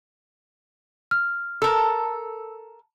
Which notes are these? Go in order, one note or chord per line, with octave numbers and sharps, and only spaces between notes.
F6
A4 A#4 E6